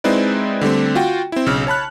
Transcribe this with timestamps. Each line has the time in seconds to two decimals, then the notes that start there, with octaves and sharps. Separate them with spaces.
0.04 G#3 C4 D#4 E4 B4 D5
0.61 D3 G3 A3 C4
0.95 F4 F#4 G5
1.32 C4 E4
1.46 B1 C#3 E6 F6
1.67 C#5 A5 B5 F#6